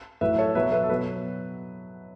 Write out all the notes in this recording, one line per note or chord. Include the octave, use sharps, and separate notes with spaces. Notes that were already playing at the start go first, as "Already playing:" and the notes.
Already playing: A5
A2 F#3 B4 E5
A4 C#5
B2 F#3 B4 E5
B4 E5
A4
B2 F#3 B4